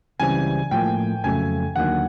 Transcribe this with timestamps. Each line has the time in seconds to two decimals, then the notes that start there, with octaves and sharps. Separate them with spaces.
0.20 C#2 C#3 E3 G3 C4 G#5
0.71 A2 F3 A#3 G5
1.24 F2 C#3 F#3 A3 G#5
1.76 D#2 D3 F#3 A#3 D#4 F#5